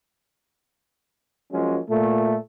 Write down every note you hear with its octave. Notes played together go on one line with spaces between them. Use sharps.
F3 F#3 G#3 A#3 C#4
A#2 A3